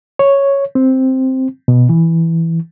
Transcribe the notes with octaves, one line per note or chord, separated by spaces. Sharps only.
C#5
C4
B2
E3